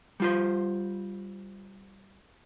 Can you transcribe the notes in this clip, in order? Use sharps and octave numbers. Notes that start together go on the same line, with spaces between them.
G3 F4 C5